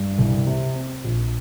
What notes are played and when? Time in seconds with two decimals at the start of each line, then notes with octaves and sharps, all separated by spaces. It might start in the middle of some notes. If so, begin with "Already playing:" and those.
Already playing: G2
0.19 C2
0.47 C3
0.76 C4
1.04 A#1